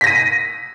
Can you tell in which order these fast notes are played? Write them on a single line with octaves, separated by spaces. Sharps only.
B6 A#6 D#7